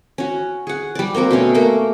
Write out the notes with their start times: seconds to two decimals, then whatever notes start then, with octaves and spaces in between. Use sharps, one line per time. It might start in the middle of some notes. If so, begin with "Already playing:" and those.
0.18 C#4 F#4
0.67 G#4 F#5
0.95 G3 D5
1.15 A#3 C4 F#4 A#4
1.31 B2 A3 C#4
1.55 A3 A#3 A#4